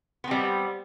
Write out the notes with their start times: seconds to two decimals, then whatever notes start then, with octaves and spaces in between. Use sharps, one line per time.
0.24 B3
0.28 C4
0.31 G3